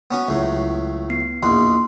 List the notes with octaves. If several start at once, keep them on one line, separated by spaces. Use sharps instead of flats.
B3 C#4 F#4
C#2 A2 F#3
B3 C7
A#1 E2 B2 C6